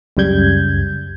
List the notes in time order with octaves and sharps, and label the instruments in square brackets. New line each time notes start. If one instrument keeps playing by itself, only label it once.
[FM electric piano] C#2 F#2 C#3 G3 G6 G#6